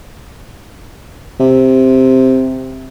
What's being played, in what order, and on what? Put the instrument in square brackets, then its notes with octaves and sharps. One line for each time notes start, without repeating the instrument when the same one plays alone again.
[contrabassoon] C3